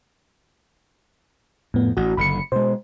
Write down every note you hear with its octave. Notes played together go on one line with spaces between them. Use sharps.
F2 A2 B3
A1 F#4
F#1 D3 B5 C#7
B2 G#3 C5